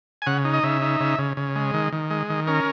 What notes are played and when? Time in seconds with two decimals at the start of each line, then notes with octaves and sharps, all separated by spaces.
0.22 G#5
0.26 C#3 F#5
0.45 D#4
0.54 D#5
0.63 C#3 E5
0.82 D#4
1.00 C#3
1.19 C#3
1.37 C#3
1.56 G#3
1.74 D#3
1.93 D#3
2.10 G#3
2.30 D#3
2.47 C#4 A#4